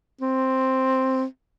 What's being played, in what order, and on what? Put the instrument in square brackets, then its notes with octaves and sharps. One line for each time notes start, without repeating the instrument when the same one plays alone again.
[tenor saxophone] C4